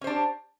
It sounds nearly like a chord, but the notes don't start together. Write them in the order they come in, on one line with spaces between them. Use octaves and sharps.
C#4 C5 D4 G4